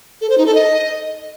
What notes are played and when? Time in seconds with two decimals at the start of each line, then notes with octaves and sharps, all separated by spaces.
0.21 A4
0.30 C5
0.38 D#4
0.46 A4
0.54 D#5